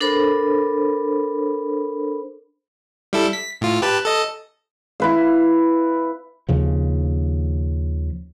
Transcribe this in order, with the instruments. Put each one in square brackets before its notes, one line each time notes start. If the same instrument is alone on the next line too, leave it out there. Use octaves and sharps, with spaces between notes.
[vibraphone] D4 A4 A#4 C5 B5
[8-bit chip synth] G3 E4 A4
B6
A2 F4
G4 B4 A5
A4 D#5
[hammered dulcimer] E4 B4 F5
[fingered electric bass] D#2 C#3 F3